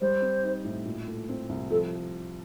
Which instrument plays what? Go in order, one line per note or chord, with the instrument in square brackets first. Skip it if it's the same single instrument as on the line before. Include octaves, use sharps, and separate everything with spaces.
[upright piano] G3 [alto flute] C5
[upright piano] C4
D#4
A2
A#2
A3
C4
C2
[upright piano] F3 [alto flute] A4